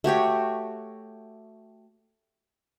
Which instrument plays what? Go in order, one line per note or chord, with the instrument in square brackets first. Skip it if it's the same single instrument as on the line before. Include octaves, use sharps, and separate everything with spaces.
[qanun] A3 F#4 G4 C#5